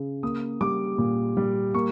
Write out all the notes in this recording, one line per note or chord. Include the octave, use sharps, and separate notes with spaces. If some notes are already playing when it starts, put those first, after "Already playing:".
Already playing: C#3
A#3 D#6
G3 D6
A#2
G3
A#3 C#6